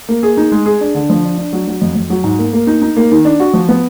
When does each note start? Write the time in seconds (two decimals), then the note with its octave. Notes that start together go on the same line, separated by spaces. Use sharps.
0.09 A#3
0.23 G#4
0.37 D#4
0.52 G#3
0.66 G#4
0.81 D4
0.95 D3
1.10 F3
1.24 D4
1.38 D4
1.53 F#3
1.67 F#3
1.81 F2
1.95 F2
2.10 F#3
2.24 G#2
2.39 A#3
2.53 A#3
2.67 D#4
2.82 D#4
2.97 A#3
3.12 D#3
3.25 D4
3.40 F#4
3.54 F3
3.69 B3